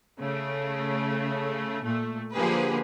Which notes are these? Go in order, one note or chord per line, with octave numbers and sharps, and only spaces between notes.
C#3 A3
A#2 A3
D3 F3 A#3 G4 G#4 B4